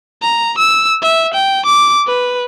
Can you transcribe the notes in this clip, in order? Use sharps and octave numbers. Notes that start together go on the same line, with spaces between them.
A#5
E6
E5
G5
D6
B4